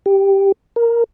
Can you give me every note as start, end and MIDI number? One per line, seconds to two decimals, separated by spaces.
0.06 0.52 67
0.76 1.04 70